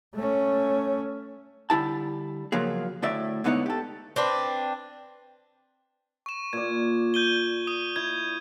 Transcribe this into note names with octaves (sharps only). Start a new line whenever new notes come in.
A3 C#4
D3 G3 E4 A5
C#3 F3 F#3 A#3 G#4
D2 A2 D5 E5
G#2 D3 B3 D#4 E4 C#5
G4 A4
C4 D4 B4
C#6 E7
A#2 D5 G#6
G6 D#7 G7
D#6 D#7
E4 G#6